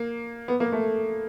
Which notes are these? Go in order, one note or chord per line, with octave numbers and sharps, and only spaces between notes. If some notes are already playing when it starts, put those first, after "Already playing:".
Already playing: A#3
B3
A#3
A3